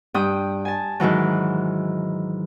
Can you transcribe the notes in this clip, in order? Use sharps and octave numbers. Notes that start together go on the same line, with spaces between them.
G2 G5 D#6
G#5 A5
G#2 D#3 E3 F#3